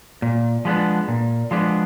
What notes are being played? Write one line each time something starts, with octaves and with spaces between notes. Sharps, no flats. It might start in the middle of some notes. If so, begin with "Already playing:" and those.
A#2
F3 G#3 B3 D4
A#2
F3 G#3 B3 D4